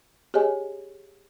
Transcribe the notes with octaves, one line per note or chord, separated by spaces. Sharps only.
G4 G#4 C#5 D#5 G#5